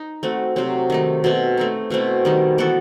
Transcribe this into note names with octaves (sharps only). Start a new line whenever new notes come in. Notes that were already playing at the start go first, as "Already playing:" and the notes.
Already playing: D#4
A3 C4 F#4
C3 F#3 C4
D#3 A3 D#4
B2 A3 C4
A3 C4 D#4
B2 A3 C4 E4
D#3 G3 D#4
E3 B3 F#4 A4